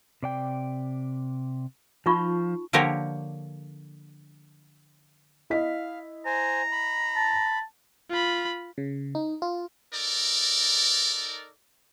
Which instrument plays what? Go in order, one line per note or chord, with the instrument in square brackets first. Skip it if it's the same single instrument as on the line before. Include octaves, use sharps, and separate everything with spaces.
[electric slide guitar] C3 D5 G5
[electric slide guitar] F3 [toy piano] D#4 F4 C#6
[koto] D3 F3 A#3 G4 A#4 C#5
[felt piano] E4 D#5 B6 [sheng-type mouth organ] F5
[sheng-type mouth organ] C5 G#5 [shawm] A#5
[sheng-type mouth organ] B5
[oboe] A5
[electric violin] F4 B5
[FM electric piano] C#3
D#4
F4
[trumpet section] D#4 A4 A#4 D5